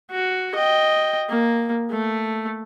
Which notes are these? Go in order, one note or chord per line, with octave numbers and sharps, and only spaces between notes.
F#4
D#5 G5
A#3
A3